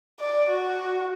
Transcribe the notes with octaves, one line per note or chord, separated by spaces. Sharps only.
D5
F#4